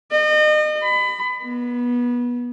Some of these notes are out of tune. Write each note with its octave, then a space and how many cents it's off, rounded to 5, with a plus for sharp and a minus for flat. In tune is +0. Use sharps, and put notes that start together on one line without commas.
D#5 -35
B5 +25
B3 -25